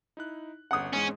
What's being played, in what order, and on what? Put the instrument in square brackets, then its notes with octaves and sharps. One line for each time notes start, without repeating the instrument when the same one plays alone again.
[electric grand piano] D#4 E4 F#6
[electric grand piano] G1 C#4 [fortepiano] F#5 D#6
[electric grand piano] E2 G#2 G#3 [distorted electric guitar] C#4